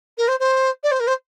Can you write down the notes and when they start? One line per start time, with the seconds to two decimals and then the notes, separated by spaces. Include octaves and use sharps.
0.18 A#4
0.28 C5
0.40 C5
0.83 D5
0.91 C5
1.00 A#4
1.07 C5